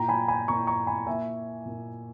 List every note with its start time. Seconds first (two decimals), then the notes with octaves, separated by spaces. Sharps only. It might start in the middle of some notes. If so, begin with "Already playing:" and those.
Already playing: A#2 A#3 E4 G5 A#5
0.09 G#5 B5
0.28 G#5 B5
0.48 A#2 A#3 E4 A#5 C#6
0.67 A#5 C#6
0.87 G#5 B5
1.07 A#2 A#3 E4 E5 G#5
1.65 A#2 A#3 E4